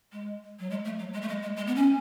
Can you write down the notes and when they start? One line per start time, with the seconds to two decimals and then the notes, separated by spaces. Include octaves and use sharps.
0.12 G#3
0.59 F#3
0.70 G#3
0.85 A3
0.99 F#3
1.13 G#3
1.22 A3
1.28 G#3
1.42 G#3
1.57 G#3
1.67 B3
1.76 C#4